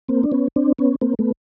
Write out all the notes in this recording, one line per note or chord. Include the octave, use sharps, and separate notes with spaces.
A#3 C4
D4
B3 C#4
C4 D4
B3 C#4
A#3 C4
A3 B3